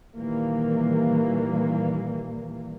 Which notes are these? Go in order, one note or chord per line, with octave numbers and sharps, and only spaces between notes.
A#2 D#3 E3 G3 A#3